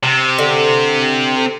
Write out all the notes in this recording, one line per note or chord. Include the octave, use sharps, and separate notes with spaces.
C3
D3